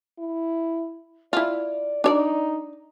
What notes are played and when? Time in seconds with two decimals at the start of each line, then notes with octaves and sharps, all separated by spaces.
0.19 E4
1.33 E4 F4 D5
2.04 D4 D#4 C#5 D5